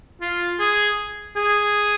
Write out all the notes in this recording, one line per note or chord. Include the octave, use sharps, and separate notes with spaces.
F4
G#4
G#4